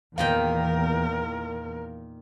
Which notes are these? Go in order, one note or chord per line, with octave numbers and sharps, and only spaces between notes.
E2 A#2 D#3 A#4 F5 G5